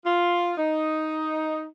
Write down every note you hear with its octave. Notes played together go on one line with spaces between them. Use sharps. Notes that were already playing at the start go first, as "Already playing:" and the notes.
F4
D#4